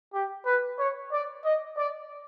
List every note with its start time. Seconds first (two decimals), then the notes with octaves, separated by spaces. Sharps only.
0.14 G4
0.46 B4
0.78 C#5
1.12 D5
1.45 D#5
1.78 D5